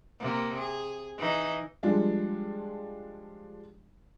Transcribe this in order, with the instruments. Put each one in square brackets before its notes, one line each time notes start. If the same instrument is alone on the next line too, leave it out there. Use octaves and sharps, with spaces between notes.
[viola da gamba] C3 A#3
G#4
E3 D#4
[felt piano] F3 G3 G#3 D4